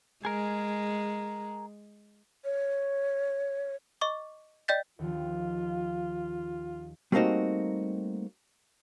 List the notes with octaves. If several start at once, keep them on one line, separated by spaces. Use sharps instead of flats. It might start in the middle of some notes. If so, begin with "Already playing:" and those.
G#3 G#4 A#4
C#5
D#5 C#6 D6
D5 D#5 G5 G6 A6 B6
D#2 D#3 F3 F4
G3 A3 A#3 C4 D#4 F#4